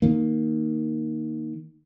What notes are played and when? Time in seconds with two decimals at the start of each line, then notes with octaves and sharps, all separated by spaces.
0.02 D#3 A#3